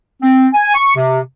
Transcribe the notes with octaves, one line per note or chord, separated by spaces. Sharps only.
C4
G#5
C#6
C3